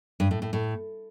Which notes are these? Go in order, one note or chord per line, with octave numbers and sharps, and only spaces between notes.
G2
A2
A2
A2